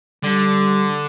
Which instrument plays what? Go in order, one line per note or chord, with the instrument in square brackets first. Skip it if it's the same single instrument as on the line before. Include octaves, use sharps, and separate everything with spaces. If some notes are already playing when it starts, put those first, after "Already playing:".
[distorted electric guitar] D3 [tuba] G3